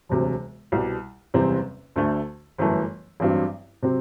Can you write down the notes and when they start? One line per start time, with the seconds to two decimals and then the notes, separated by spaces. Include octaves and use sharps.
0.09 E1 D2 C3 F#3
0.72 C2 B2 G3
1.34 F#1 E2 C3 G3 C4
1.96 D2 D3 A3
2.58 G1 F#2 E3 A3
3.20 A1 G2 F#3 C4
3.83 C3 F#3 C4